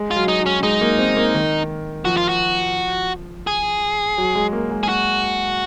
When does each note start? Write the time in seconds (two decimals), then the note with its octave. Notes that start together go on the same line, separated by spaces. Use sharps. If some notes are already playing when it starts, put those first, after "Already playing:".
Already playing: G#3
0.11 F4
0.16 F#3
0.28 D#4
0.40 F#3
0.46 C#4
0.63 G#3 D#4
0.81 A#3
0.99 C4
1.17 A#3
1.34 D#3
2.05 F3 F#4
2.17 F4
2.29 F#4
3.47 G#4
4.18 F#3
4.35 G#3
4.53 A#3
4.71 G#3
4.83 G#4
4.89 F#4